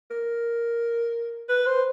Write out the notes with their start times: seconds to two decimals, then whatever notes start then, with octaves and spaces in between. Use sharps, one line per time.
0.10 A#4
1.49 B4
1.66 C5